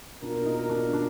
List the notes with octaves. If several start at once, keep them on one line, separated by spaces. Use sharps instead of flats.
B2 A#3 D4 F4 A#4
D#4
D4
D4